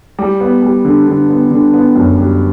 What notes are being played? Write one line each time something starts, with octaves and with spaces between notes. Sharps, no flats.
G3
B3
G3
D3
D3
B3
D3
B3
F#2
G3